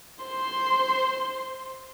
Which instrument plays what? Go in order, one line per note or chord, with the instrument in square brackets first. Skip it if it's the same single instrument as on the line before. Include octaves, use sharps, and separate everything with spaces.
[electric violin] C5 C6